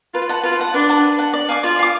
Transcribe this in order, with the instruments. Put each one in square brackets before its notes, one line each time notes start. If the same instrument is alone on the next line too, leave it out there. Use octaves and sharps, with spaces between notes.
[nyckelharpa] F4 [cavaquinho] B4
[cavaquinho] F#5 A5
[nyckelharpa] F4 [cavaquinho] B4
[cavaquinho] F#5 A5
[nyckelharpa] D4 [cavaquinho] B4
[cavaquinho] F#5 A5
B4
F#5 A5
D5
F5 G#5 D6
[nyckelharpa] F4 [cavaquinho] D5
[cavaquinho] F5 G#5 D6